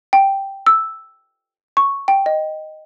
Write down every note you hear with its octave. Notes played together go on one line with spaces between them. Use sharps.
G5
E6
C#6
G5
D#5